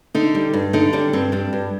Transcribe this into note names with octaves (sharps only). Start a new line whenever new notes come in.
D3 D#4
G3
G2
D3 D#4
G3 D4
G2 C4
G3 D4
G2